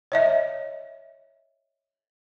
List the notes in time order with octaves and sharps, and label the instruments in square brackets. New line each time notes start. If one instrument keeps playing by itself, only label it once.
[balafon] C#5 D#5 E5